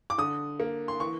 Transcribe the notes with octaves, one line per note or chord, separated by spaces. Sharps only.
D6
D3 D#6
A#3
C6
E3 C#6